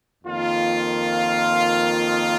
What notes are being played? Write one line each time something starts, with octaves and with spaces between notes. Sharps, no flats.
F2 D#3 A#3 F4
F5
D#5